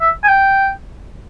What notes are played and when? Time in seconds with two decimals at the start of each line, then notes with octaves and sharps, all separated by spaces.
0.01 E5
0.24 G#5
0.28 G5